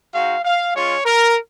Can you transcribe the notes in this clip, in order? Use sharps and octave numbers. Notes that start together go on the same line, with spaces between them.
G#3 D#4 F#4 F5
F5
G#3 C#4 F4 C#5
A#4